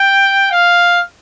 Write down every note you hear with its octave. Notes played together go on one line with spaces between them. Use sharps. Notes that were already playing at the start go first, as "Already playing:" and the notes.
Already playing: G5
F5